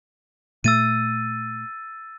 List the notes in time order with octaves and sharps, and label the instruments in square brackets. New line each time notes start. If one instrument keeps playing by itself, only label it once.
[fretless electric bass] A#2 A3 [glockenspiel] E6 A6 D#7